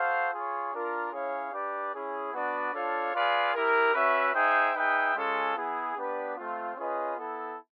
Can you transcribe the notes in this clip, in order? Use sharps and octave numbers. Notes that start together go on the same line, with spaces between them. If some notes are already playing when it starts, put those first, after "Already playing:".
Already playing: F#4 A4 C5 F5
F4 G#4 C#5
D4 F4 A#4
C#4 E4 G#4 C#5 F5
D4 G4 B4 D5
C#4 E4 G#4
B3 D4 F#4 B4 D5
D4 F4 A4 C#5 F5
F4 G#4 B4 D5 F5
E4 G4 A#4
C#4 F#4 B4 E5
D#4 G#4 C5 E5 G5
D#4 G#4 B4 E5 G5
G#3 C#4 F4 A4
B3 E4 G#4
B3 D4 G4 B4 D5
A3 C4 F4
C#4 F4 G#4 B4 D#5
B3 E4 A4